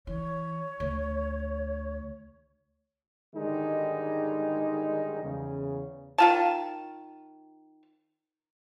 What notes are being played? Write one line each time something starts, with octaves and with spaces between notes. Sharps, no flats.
E3 C#5
D2
G#2 D3 D#3 G3 G#3 D#4
E2 C#3
D#3 F4 A5